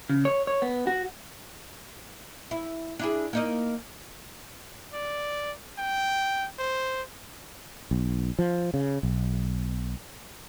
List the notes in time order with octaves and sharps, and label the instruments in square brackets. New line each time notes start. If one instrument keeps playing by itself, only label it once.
[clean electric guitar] C#3
C#5
C#5
B3
F#4
[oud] E4
D4 E4 G#4
A#3 D#4 D#5
[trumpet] D5
G5
C5
[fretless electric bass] B1
F3
C#3
B1